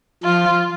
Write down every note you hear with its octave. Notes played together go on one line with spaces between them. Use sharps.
F3 F4